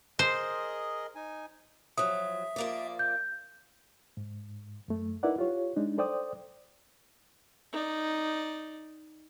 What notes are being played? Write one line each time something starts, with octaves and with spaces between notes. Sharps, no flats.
G#4 A#4 C5 D#5
D#4 G#5
F3 F#3 E5 D#6
F3 A#3 D5
G6
G#2
F#2 A3
D#4 E4 A#4 B4 D5 F#5
F4 G4 C#5
G#3 D4 D#4
A4 C5 D5 G5 D#6
D#4 D5